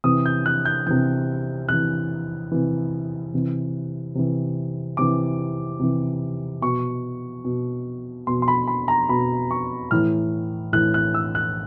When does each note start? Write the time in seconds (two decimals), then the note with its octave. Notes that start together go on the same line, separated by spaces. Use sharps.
0.04 C3 E3 D#6
0.26 G6
0.46 F#6
0.65 G6
0.87 C3 E3 G6
1.69 C3 E3 F#6
2.51 C3 E3
3.34 C3 E3
4.15 C3 E3
4.97 C3 E3 D6
5.79 C3 E3
6.62 B2 C#6
7.45 B2
8.27 B2 C6
8.42 C6
8.48 B5
8.67 B5
8.88 A#5
9.09 B2 B5
9.51 C#6
9.91 A2 E3 F6
10.73 A2 E3 F#6
10.94 F#6
11.14 E6
11.35 F#6